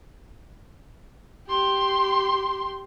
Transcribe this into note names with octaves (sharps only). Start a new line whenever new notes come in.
G4 C6